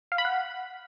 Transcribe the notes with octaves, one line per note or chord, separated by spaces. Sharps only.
F5
B5
F#5